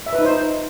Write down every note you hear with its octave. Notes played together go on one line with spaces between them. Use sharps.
E5
B4
D#4
C5